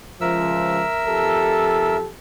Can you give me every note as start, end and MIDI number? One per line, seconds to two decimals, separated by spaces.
0.21 0.83 37
0.21 0.83 53
0.21 1.97 70
0.21 1.97 76
0.21 1.97 88
1.07 2.09 41
1.07 2.09 67
1.07 2.09 69